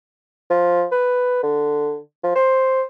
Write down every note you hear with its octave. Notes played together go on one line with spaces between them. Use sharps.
F3
B4
D3
F3
C5